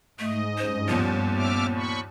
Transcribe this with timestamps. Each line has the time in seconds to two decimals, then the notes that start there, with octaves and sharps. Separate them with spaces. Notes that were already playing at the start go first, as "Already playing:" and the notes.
0.19 G#2 A3 D#5
0.58 G2 C#4 C5
0.88 D#2 A#2 F3 B3
1.36 E5 D6 F6
1.75 B5 C#6